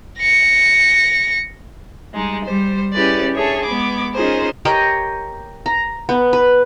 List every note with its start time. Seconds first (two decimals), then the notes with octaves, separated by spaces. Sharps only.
0.19 A#6 C#7
2.14 G3 G#3 D#4
2.44 G3 C5
2.93 C#4 E4 G4 G#4 B4 D5
3.34 D4 G#4 A4 C#5 E5
3.64 G#3 B3 B5 D6 G#6
4.13 C#4 D#4 F4 G#4 A#4 C5
4.65 G4 A#4 C#5 D#5
5.66 A#5
6.09 B3
6.33 B4